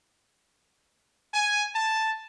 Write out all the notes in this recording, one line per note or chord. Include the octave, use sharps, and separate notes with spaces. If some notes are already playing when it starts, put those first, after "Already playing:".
G#5
A5